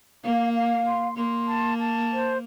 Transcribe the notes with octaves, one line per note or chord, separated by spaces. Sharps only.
A#3 F5
F5
C6
A#3 C6
A5
A5
C5